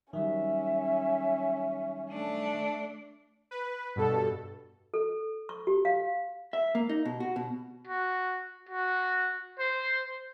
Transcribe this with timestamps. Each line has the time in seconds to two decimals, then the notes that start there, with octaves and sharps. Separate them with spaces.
0.13 D#3 F#3 G3 C#4 E5
2.09 A3 D4
3.51 B4
3.96 G2 B2 A4
4.94 A4
5.49 C#6
5.67 G4
5.85 F5
6.53 E5
6.75 A#3
6.89 D#4
7.05 B2
7.20 F#4
7.36 B2
7.88 F#4
8.69 F#4
9.59 C5